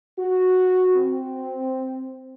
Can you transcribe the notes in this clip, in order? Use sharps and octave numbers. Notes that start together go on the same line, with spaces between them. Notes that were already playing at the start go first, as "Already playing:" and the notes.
F#4
C4